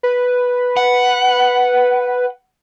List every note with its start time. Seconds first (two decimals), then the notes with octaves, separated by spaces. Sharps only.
0.03 B4
0.77 F#5